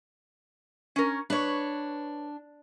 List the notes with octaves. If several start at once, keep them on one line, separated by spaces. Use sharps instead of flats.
C#4 A#4
D4 B4 C#5